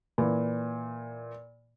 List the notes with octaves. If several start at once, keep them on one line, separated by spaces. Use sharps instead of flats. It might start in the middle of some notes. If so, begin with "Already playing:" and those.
A#2 E3